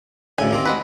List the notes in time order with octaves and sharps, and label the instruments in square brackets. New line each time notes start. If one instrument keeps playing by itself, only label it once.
[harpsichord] D2 A2 C#3 [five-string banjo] G#5
[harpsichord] D#2 A#3 C4
[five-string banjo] G#3 F#4 B4